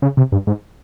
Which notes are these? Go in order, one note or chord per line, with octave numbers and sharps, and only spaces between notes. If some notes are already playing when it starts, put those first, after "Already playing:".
C#3
C3
G2
G#2